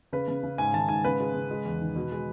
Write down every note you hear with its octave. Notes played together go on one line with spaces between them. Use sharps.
C#3 B4
C#3
C#3
G#2 G#5
D#3 A5
G#2 G#5
C#3 B4
G#3
C#3
G#3
E2
D#3
B2
G#3